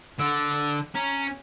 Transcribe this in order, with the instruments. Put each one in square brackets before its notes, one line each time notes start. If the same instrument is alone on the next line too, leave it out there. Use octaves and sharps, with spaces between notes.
[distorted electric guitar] D3 [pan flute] E6
[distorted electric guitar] C#4 [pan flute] A#5